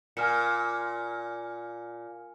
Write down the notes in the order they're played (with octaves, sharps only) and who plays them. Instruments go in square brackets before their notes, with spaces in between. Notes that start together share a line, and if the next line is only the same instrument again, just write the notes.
[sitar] A#2 [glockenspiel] G#5 F6 C#7